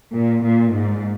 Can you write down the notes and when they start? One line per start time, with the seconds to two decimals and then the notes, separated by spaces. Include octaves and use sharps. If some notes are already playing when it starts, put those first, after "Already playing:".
0.15 A#2
0.43 A#2
0.73 G#2